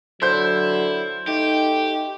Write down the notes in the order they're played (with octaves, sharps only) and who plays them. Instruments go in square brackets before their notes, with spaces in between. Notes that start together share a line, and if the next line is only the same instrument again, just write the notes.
[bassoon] D3 [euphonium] F#3 [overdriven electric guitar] E4 [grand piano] C5 G6
[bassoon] A3 [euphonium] D#4 [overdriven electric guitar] G4